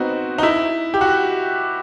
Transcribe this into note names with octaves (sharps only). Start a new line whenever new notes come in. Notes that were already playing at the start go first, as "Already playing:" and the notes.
Already playing: B3 C4 D#4 F#4
D#4
E4
G4
F#4